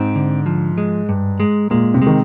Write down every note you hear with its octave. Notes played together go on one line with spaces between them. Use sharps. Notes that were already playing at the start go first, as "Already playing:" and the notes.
Already playing: G#2 C4
D3
F3
G#3
G2
G#3
A#2 G#3
C3
G#3
D#3